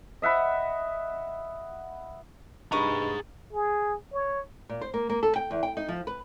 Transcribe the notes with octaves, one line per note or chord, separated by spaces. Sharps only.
D#5 E5 F#5 B5
C2 G2 D#4 G#4 D#5 A#5 B5 C#6
G#4
C#5
A#2
C5
A#3
A#3
A4
G5
E2
G5
D#4
F3
B4